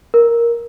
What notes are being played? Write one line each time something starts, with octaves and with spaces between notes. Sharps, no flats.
A#4